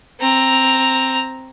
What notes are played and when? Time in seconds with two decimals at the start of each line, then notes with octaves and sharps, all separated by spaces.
0.20 C4 A#5